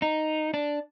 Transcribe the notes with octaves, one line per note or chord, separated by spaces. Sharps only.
D#4
D4